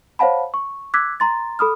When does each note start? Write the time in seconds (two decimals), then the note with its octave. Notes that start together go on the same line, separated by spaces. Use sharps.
0.19 C5 C#5 F5 F#5 A5 B5
0.54 C#6
0.94 D6 E6 F#6 G#6 B6
1.20 A#5 C6 A6
1.59 A4 B5 D#6 F6